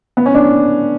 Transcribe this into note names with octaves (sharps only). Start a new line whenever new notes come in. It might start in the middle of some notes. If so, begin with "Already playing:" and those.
B3
C#4
D4